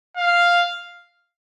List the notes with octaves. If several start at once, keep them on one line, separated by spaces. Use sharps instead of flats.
F5